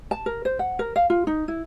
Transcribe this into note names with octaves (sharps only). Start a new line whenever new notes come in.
A5
A#4
C5
F#5
A#4
F5
F4
D#4
E4